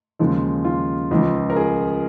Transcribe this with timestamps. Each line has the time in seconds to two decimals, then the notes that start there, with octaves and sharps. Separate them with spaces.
0.19 D#2 C#3 F3 G#3
0.65 F4
1.11 C#2 C#3 F3
1.50 A#4
1.56 G#4